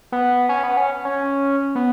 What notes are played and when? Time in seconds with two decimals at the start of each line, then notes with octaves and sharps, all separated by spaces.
0.12 B3
0.49 C#4
0.63 B3
0.77 C#4
1.05 C#4
1.75 B3